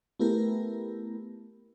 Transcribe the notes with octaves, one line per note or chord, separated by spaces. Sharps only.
A3 B3 E4 G4 A#4